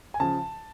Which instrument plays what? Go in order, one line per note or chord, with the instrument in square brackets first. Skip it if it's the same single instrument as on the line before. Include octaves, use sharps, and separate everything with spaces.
[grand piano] G#5
C#3 F3 A5